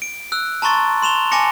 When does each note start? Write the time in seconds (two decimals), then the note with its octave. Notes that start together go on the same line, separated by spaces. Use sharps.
0.02 D7
0.32 E6 F#6
0.62 A5 A#5 C6 C#6 A6
1.02 C6 E7 F7 G7
1.32 G#5 A5 D6 A#6 C#7